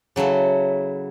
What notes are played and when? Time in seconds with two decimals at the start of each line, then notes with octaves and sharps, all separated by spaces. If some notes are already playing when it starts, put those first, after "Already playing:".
0.16 C#3 F#3 E4 A4 E5